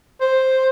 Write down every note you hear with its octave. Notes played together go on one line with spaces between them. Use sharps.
C5